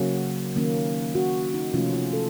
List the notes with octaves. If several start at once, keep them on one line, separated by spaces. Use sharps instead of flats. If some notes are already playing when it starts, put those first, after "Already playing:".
Already playing: C#3 F#3 A#3 C#4 F#4
D#3 A#3 C#4
F#4
D#4
C3 F3 A3 C#4 F4
F4
A4